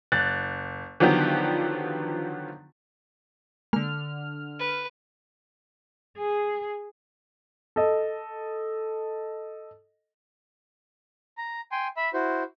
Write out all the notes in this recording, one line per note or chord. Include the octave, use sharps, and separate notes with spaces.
F#1 F#6 A6
D3 D#3 F3 F#3 B3 G4
D3 G#3 A#3 F6
B4
G#4
A4 D#5
A#5
G5 G#5 C6
E5 B5
E4 F#4 C5